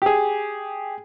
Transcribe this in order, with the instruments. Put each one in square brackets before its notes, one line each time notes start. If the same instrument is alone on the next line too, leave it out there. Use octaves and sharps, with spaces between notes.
[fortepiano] G4 G#4